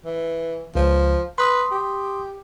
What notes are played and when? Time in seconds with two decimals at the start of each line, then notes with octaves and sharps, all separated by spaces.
0.05 E3
0.75 C#2 F3
1.38 B4 C6 D#6
1.71 G4